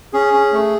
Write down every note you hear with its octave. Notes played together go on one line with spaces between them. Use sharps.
C#4 G#4
C#4
A3